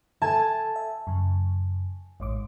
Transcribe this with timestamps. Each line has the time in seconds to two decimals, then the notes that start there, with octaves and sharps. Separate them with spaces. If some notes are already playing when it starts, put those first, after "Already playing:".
0.22 A4 E5 G#5 A5 G#6
0.76 E5
1.07 F#2 C#3
2.20 A1 G#2 D6